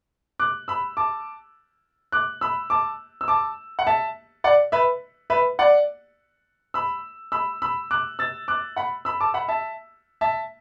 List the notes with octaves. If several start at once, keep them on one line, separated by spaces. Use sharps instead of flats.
D6 F#6
B5 E6
A5 D6
D6 F#6
B5 E6
A5 D6
E6
A5 D6
F#5
E5 A5
D5 F#5
B4 E5
B4 E5
D5 F#5
B5 E6
B5 E6
B5 E6
D6 F#6
E6 A6
D6 F#6
F#5 B5
B5 E6
A5 D6
F#5 B5
E5 A5
E5 A5